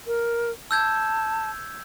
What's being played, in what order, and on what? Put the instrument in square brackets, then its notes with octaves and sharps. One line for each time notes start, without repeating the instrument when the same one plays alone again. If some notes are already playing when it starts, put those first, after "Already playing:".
[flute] A#4
[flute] A5 [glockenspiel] E6 G6 G#6